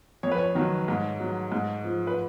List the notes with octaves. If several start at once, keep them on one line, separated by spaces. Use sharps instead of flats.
F2 C#5
B4
C#5
D#3 F#3
G#2
F#3
G#2
F3
B4